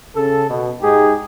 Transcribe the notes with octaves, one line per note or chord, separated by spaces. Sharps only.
C#3 A4
B2
G#2 D#4 G4 G#4